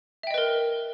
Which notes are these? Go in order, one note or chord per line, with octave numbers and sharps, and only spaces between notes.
A#4 B4 D#5 E5 G5